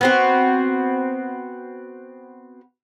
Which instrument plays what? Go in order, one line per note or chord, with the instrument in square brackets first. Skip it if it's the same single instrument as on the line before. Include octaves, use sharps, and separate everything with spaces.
[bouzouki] B3 C4 F#4